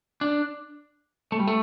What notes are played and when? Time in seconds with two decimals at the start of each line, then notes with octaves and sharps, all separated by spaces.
0.21 D4
1.32 A3
1.40 G3
1.47 A3